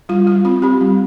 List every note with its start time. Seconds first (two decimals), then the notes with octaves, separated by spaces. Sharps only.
0.09 G3 F4
0.27 G3 F4
0.45 C4 F4
0.62 C4 G4
0.81 G3